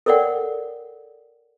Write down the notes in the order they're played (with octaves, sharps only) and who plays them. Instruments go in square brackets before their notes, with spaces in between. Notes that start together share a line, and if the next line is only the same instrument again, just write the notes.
[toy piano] A4 A#4 C#5 D5 F#5 G5